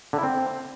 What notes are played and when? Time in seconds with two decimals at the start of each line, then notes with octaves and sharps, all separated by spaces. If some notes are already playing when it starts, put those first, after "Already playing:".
0.13 D3
0.18 E4
0.23 C4